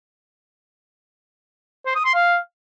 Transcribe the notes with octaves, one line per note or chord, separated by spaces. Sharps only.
C5
D#6
C6
F5